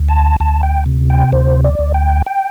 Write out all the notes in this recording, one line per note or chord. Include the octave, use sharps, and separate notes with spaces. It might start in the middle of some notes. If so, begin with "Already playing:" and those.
Already playing: D2
A5
D2 A5
G5
C3
G5
D2 C5
D5
D2
G5
G5